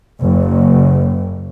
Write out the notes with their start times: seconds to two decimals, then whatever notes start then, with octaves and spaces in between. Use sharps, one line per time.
0.21 F#1